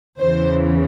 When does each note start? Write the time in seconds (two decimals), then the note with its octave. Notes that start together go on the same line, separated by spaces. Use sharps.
0.19 E2 C#3 E3 C5